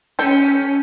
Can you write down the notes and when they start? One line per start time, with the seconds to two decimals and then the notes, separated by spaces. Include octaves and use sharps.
0.19 C#4 A4 G5